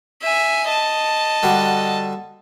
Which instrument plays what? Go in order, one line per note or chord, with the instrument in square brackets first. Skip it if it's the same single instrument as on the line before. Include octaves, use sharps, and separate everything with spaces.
[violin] E5 G#5
D#5 A5
[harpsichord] D3 G3 F#4